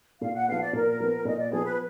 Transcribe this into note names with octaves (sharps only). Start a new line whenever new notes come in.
A#2 F5
F#5
F3 B3 F5
D5
A#2 A#4
F3 B3
A#2 D#5
D5
F3 B3 G#4
B4